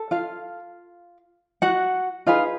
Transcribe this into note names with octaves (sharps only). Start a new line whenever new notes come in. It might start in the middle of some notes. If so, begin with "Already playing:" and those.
Already playing: A4
F4 F5
F#4 F#5
D#4 F4 G#4 B4 F5